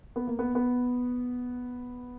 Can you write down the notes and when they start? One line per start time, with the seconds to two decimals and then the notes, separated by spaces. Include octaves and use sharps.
0.16 B3
0.27 A#3
0.39 B3
0.55 B3